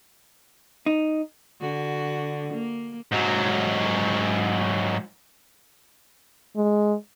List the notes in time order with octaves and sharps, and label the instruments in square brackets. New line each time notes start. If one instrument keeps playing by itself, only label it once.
[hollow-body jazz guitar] D#4
[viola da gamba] D3 F#4
A#3
[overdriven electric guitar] G#2 F#3
[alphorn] G#3